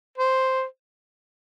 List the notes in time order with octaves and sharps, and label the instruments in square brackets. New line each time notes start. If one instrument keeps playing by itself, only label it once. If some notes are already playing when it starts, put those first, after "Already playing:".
[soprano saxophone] C5